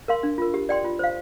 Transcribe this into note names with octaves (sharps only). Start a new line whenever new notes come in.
A#4 F5 C6
D4
F4 A#4
G4
D5 G5 C6
F4
C5 F5